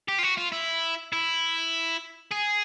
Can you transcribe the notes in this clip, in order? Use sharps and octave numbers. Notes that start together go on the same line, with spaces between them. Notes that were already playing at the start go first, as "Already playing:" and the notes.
G4
F4
F#4
F4
E4
E4
G#4